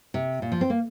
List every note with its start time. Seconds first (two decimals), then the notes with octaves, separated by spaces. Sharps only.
0.14 C3
0.42 A#2
0.52 F3
0.61 C4
0.70 A#3